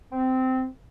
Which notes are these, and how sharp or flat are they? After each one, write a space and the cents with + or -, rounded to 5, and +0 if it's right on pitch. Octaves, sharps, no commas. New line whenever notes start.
C4 -15